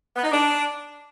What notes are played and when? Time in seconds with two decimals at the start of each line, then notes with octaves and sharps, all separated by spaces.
0.15 B3
0.23 D#4
0.31 D4